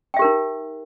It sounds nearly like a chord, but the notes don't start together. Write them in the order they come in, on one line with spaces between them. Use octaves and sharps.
G5 E5 G4 A#4 D#4